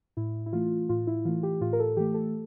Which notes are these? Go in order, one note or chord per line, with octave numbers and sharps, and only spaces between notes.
A2 E4
E4
E3 A3 F4
A2 F4
E4
E3 A3 F4
G4
A2 F4
A#4
A4
E3 A3 G4
A4